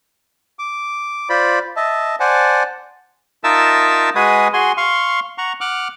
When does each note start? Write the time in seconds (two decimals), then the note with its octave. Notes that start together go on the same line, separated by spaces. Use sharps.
0.59 D6
1.29 F4 C5 D5 B5
1.76 D#5 E5 A5
2.20 C5 D5 F#5 G#5 A5
3.44 D#4 F4 A#4 E5 A5 E6
4.15 G#3 F#4 G#4 B4 G#5 D#6
4.53 F#4 G#4 G#5 C6
4.77 F5 C6 C#6
5.38 F#5 A#5 C#6
5.61 F#5 D6 F6 F#6